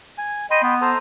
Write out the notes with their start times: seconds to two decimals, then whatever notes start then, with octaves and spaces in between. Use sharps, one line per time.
0.18 G#5
0.51 D#5 G5 B5 C6
0.63 B3
0.82 A4 C5 A#5